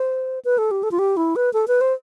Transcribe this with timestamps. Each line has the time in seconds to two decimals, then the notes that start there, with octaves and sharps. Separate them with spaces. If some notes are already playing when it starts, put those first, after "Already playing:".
Already playing: C5
0.45 B4
0.58 A4
0.71 G4
0.83 A4
0.91 F4
0.99 G4
1.17 E4
1.36 B4
1.53 A4
1.68 B4
1.81 C5